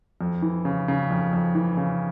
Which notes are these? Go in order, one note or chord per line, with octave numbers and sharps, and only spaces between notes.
F2
E3
C#3
C#3
F2
F2
E3
C#3